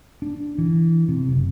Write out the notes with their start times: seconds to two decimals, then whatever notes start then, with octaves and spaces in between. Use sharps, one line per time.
0.22 D4
0.58 E3
1.08 C3
1.29 F#1